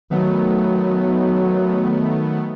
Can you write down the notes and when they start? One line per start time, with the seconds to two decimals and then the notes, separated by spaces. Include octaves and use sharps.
0.11 D#3 F#3 A3 B3